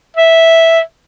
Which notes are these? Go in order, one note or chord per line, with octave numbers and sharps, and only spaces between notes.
E5